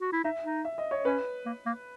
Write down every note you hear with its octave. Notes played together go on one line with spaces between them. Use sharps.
F#4
E4
D#4 E5
D#4
E5
D#5
C#5
C#4 B4
A#3
A#3